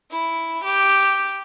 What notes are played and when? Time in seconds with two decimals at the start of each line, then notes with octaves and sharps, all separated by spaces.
0.11 E4
0.64 G4